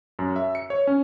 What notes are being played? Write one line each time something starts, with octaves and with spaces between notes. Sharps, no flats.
F#2
E5
C#7
C#5
C#4